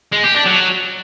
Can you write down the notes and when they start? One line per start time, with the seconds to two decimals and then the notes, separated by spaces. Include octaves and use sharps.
0.13 G#3
0.24 G4
0.35 D4
0.46 F#3